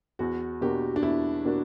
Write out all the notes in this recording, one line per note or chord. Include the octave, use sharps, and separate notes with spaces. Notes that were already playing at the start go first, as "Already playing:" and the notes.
E2 F#4
B2 A#3 D4 F#4 G4
D4
E2 E4
B2 A#3 D4 F#4